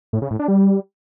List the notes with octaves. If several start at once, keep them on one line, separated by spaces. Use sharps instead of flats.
A2
C#3
A2
D4
G3